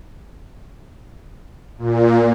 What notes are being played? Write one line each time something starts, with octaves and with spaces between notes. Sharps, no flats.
A#2